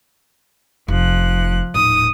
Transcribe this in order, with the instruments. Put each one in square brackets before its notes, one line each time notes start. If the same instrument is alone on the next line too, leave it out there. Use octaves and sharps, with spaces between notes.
[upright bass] F1 [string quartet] F3 F#6
[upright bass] D#1 A2 [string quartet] D#6